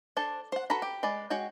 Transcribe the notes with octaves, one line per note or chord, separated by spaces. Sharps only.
D4 A4 C5 A5
C5 F#5
F#4 A4 B4 A#5 B5
G4
G#3 B4 D5
G#3 F#4 C#5 G5